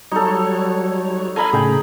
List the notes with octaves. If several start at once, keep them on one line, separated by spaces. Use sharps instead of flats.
F#3 G3 D#4 A4 C#5
A4 D#5 F5 G#5 A#5 B5
A2 C#3 G#4 G5